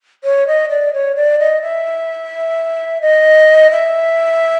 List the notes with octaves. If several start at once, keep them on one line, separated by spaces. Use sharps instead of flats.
C#5
D#5
D5
C#5
D5
D#5
E5
D#5
E5